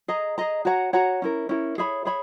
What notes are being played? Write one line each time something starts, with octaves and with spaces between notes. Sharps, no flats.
G#4 D#5 A#5
G#4 D#5 A#5
F#4 C#5 F#5 A#5
F#4 C#5 F#5 A#5
C#4 E4 A#4
C#4 E4 A#4
G#4 C#5 E5 B5
G#4 C#5 E5 B5